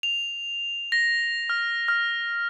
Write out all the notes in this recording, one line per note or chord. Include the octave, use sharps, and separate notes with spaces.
F7
A#6
F6
F6